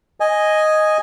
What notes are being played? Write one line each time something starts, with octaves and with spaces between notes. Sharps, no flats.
D#5 G#5